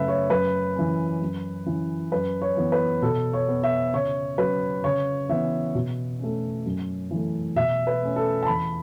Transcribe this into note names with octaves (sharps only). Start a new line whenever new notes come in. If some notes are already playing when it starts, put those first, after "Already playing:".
Already playing: F#2 C#3 A3 B4 E5
C#5
F#2 B4
E3 C#4
F#2
E3 C#4
F#2 B4
C#5
E3 B3
B4
B2 A4
C#5
B3
E5
C#3 C#5
F#3 C#4 B4
C#3 C#5
E3 B3 E5
B2
A3 C#4
F#2
E3 A3
B2 E5
B4
A3 C#4
A4
A5
E2 B5